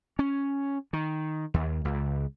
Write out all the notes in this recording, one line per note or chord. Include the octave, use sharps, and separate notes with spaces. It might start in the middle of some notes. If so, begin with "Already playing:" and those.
C#4
D#3
D#2
C#2